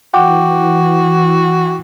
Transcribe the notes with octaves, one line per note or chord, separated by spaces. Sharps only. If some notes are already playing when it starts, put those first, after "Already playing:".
E3 F#4 F#5 G5 D6